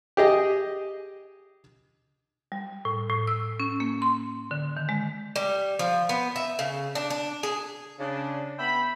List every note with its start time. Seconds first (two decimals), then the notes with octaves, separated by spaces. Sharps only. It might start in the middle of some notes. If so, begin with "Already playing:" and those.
0.17 G4 G#4 D#5
2.52 G3
2.85 A2
3.09 A2
3.27 E6
3.60 C#4
3.80 A#3
4.02 C6
4.51 D3
4.77 D#3
4.89 G#3
5.36 G3
5.79 F3
6.09 B3
6.36 E5
6.59 C#3
6.95 D4
7.10 D4
7.43 G#4
8.00 C#3 D4
8.59 B3 E5 G5 B5